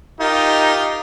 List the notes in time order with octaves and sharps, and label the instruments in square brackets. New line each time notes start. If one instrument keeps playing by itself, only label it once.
[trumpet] D#4 [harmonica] F4 G4 A#4